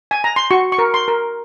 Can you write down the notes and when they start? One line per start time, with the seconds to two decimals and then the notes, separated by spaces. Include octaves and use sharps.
0.11 G#5
0.24 A#5
0.36 C6
0.51 F#4 C#6
0.72 C#6
0.78 A#4
0.94 C6
1.08 A#4